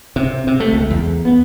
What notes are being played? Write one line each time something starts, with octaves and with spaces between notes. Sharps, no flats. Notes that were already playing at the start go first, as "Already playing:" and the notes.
C3
C3
A3
C#2
E2
B3